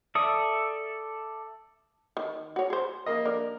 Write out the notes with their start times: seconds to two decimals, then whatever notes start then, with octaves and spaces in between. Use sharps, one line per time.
0.15 A4 D5 E5 D#6
2.17 D#3
2.56 F#4 C#5
2.70 G#4 C5
3.06 A#3 D#5
3.25 D4 A#4